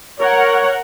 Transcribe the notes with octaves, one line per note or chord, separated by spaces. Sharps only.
A#4 C#5 F#5